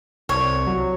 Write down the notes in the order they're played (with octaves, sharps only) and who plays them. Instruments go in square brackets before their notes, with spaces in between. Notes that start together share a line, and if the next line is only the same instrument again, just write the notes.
[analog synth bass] C2 [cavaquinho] C#5
[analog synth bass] F#3